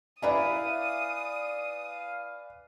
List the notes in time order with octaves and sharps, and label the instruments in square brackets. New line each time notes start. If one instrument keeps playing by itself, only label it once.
[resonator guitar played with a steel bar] E4 E5 A#5 [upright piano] B4 D5 G#5 [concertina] F5 [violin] D#6